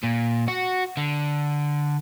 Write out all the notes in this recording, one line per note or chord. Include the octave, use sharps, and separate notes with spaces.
A#2
F#4
D3